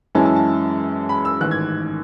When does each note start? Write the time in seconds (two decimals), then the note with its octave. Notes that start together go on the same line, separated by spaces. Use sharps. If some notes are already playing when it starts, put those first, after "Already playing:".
0.15 F#2 E3 G#3 C#4 E4 A5
0.26 A5
0.36 A5
1.09 B5
1.25 E6
1.41 A1 G#2 D#3 F#6
1.51 G#6